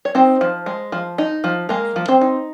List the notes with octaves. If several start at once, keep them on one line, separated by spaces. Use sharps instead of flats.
C#5
C4 D#4 C5
F3
G#3
F3
D#4
F3
G#3 A#3 A#4
F3
C4 C5
D#4